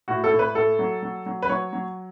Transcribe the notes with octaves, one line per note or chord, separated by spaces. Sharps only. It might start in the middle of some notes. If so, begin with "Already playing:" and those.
A2 F#4
A4
A2
B4
A2 A4
F#3
F#3
F#3
B4
F#3 C#5
F#3